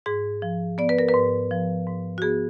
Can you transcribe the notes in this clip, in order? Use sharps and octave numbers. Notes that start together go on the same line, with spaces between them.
G#2 G#4
F3
B3 D5
B4
A#4
B4
G#2
F3
G#2
F#4
B3 G#4